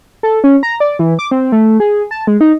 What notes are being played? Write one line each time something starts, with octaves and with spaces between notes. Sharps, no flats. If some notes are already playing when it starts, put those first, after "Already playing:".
A4
C#4
A#5
D5
E3
D6
C4
A3
G#4
A5
G#3
D#4